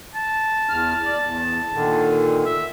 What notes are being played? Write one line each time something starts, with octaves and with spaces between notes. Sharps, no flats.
A5
E2 F6
D5
E2
A#2 D3 D#3
E5